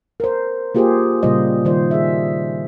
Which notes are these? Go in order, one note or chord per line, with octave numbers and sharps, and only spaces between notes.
A#4 C5
A#3 F4 G4 G#4 A#4 C5
A#2 C#3 G3 F4 C5 D#5
D#3 G3 F4 C5 D5
G#4 E5